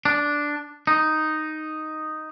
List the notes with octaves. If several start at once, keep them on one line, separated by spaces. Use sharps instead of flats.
D4
D#4